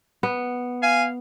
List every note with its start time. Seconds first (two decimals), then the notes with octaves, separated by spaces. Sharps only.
0.23 B3
0.83 F5 G#5